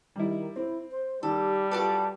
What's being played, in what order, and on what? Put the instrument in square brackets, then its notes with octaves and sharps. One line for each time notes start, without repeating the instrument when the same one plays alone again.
[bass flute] D#3 [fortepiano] G3 E4
[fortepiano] C4 [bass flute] E4
[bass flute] C5
[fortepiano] D#3 [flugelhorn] G3 [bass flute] G4 [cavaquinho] A4
[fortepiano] F4 F#4 B4 [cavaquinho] A4 D5 A5